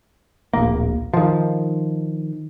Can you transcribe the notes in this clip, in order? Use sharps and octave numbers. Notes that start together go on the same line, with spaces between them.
D1 A#1 A#3
D#3 F3